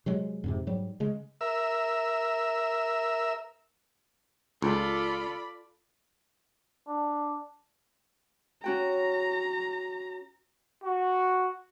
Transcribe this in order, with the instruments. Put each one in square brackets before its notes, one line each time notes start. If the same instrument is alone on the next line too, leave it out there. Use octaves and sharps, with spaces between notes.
[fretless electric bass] C3 F#3 G#3
F2 G#2 C3
G#2 F#3 G3
C#3 G#3
[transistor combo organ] A#4 E5 E6
[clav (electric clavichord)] C#2 [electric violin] F4 A4 [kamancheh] D5 B5
[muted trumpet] D4
[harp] C#4 F#4 G5 [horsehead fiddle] A#5
[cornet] F#4